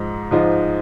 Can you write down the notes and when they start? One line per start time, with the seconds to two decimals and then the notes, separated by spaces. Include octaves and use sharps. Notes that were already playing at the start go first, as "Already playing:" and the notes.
Already playing: G#2 F3 G#3 D#4
0.31 G#2 F3 G#3 D#4